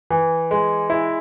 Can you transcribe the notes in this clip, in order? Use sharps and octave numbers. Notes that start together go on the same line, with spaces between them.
E3
G#3
E4